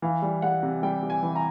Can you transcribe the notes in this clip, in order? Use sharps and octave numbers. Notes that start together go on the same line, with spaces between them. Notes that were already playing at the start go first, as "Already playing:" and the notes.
E3 F5
G3
G3 F#5
C3
G3 G5
G3
G#5
E3
A#5